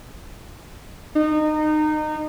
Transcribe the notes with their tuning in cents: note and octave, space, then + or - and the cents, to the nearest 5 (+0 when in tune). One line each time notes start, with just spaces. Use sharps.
D#4 -25